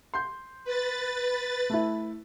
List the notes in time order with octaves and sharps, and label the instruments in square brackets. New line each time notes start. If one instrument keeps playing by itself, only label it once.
[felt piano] C6 G6
[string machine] B4 A6
[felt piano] A3 E4